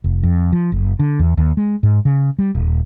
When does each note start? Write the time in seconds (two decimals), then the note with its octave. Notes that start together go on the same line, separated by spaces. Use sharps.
0.04 F1
0.23 F2
0.53 F3
0.72 F#1
0.99 D3
1.19 E2
1.38 D#2
1.57 G#3
1.83 G#2
2.05 C#3
2.39 G3
2.55 D#1